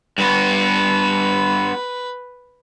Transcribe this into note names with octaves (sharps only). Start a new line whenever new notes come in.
G2 B3 B4